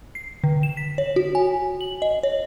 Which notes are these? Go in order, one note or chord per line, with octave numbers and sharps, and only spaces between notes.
C7
D3
E7
B6
C#5
F#4
G#5
F#7
D#5
C#5